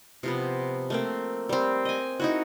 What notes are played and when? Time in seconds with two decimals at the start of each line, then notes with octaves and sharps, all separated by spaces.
0.23 C3 F3 B3
0.90 A3 A#3 C4
1.49 G3 C4
1.85 D#5 G#5
2.20 D#4 E4 F#4